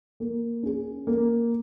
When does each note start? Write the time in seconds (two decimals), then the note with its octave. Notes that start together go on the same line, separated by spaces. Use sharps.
0.20 A#3
0.63 C#4 G#4
1.07 A#3